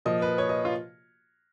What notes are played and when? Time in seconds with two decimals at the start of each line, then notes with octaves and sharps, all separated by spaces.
0.05 A#2 F3 D#5
0.22 B4
0.38 C#5
0.49 D#5
0.65 F4